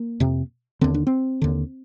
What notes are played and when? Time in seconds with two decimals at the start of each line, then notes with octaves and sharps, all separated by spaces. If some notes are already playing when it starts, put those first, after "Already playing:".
Already playing: A#3
0.20 F2 C3
0.81 D#2 D3 C4
0.94 D4
1.07 C4
1.42 D#2 D3